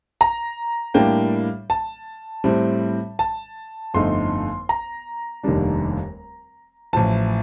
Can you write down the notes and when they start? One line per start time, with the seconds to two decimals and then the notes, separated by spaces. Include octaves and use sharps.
0.21 A#5
0.94 A2 G3 A#3 D4 G5
1.70 A5
2.44 A2 G3 C4
3.19 A5
3.94 G1 F2 D3 A3 D#4 C6
4.69 A#5
5.43 F1 D#2 D#3 G3 D4
6.93 A1 A2 F3 A5